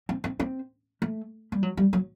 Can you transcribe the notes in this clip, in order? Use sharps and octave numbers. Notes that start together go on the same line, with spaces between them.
C4
C4
C4
A3
G3
F#3
G3
F#3